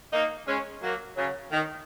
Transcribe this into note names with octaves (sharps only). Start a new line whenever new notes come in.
A#3 D#4
G#3 C#4
F#3 A#3
C#3 F#3
D#3